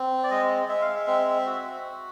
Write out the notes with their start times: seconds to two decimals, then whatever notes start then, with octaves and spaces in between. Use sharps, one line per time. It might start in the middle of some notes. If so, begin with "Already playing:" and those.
Already playing: C4
0.23 D5
0.30 G#3 D#5
0.69 G#3 E5
0.82 F5
0.96 E5
1.07 C4
1.46 F#4